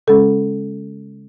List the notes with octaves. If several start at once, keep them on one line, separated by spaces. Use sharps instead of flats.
C#3 G#3 C#4 A4